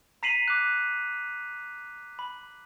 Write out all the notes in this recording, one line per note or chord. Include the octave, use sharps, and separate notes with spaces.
A#5 B6 C7 D#7 F7 F#7
D6 F#6
B5